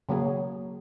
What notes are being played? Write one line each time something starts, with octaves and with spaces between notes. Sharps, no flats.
C#3 F#3 A#3 G#4